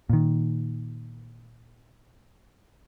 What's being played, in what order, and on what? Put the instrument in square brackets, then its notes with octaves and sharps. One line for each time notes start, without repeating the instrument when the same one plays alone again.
[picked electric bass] A#2 D#3